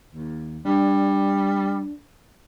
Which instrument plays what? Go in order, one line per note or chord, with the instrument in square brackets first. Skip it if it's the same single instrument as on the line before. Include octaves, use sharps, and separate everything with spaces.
[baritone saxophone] D#2
[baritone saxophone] G3 [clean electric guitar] D4